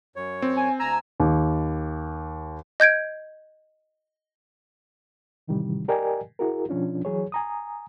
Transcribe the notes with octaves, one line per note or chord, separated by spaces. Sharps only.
F#2 C#5
C4
G#5
D2 G#5 A#5 E6
D#2
D#5 G6 G#6 D7
A2 C3 D#3 E3 G3
G4 A#4 D5 D#5 G5 G#5
E4 F#4 G#4 A#4
B2 F3 C#4 D4 F4
E3 F#3 G#4 C#5
G#5 A#5 D#6